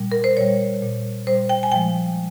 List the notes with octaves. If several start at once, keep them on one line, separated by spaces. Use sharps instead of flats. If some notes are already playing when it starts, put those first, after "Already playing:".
Already playing: A#2 G3
A#4
C5
A#2 G3 C#5
A#2 G3
A#2 G3 C5
G5
G#5
A#2 F3 G#3 G5